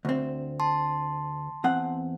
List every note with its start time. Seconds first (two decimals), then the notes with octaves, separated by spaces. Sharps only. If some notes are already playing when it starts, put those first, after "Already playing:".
0.05 D2 C4
0.60 A5 C6
1.64 E2 C4 F#5